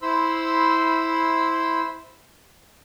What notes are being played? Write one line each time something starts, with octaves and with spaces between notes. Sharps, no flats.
E4 C5 B5 C6 E6